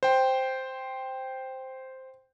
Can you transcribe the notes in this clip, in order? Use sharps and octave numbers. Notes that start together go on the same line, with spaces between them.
C5 G5